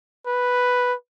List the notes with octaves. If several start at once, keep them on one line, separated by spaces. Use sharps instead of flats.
B4